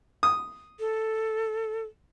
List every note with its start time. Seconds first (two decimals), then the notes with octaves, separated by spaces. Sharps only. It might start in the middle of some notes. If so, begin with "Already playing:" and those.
0.23 D#6
0.80 A4